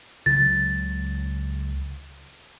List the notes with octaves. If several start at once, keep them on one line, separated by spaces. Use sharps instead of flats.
C#2 C#3 F#3 A6